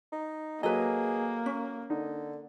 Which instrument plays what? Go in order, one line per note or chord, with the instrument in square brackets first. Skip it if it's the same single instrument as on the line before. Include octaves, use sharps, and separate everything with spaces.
[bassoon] D#4
[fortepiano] F#3 A4 A#5 [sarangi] A#3 [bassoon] G#4 [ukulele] B4 D#5
[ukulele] C#4
[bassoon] D3 [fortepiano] D#4